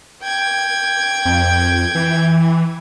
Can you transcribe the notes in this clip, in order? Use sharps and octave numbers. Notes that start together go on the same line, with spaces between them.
G5 G#6
F2
E3